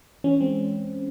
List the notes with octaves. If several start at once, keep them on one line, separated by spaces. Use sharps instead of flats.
E3 C#4
G#3 C4